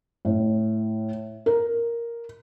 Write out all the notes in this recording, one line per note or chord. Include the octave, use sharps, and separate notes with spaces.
A2
A#4